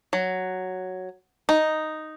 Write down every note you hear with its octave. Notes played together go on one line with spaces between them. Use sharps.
F#3
D#4